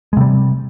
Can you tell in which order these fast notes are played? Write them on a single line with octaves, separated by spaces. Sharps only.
G#3 C3 G3